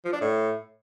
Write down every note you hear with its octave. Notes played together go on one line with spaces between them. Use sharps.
F3
D4
A2